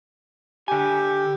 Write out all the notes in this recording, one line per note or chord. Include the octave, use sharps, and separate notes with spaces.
D3 G4 G#5